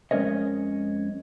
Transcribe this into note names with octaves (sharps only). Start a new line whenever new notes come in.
F2 G#3 C#4 A#4 C#5 D#5